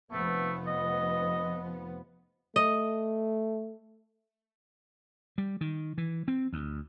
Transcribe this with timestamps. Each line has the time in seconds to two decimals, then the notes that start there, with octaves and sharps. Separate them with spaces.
0.12 F1 F3 A3 B3
0.67 D#5
2.56 A3 D#5
5.38 G3
5.61 D#3
5.98 E3
6.28 C4
6.53 D2